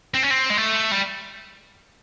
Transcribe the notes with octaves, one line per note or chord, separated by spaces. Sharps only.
C4
C#4
C4
G#3
A3
G3